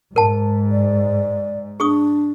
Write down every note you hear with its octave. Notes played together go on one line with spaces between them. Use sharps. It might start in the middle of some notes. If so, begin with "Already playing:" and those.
G#2 A#4 A5
D5
D4 G#4 C#6 D#6